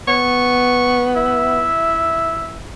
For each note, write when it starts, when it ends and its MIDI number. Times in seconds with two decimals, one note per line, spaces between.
0.08 1.70 59
0.08 1.10 85
1.16 2.68 64
1.16 2.58 76